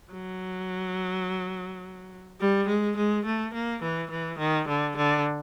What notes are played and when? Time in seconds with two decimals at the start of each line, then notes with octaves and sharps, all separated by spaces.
0.12 F#3
2.40 G3
2.68 G#3
2.97 G#3
3.25 A3
3.54 A#3
3.82 E3
4.11 E3
4.39 D#3
4.68 D3
4.97 D3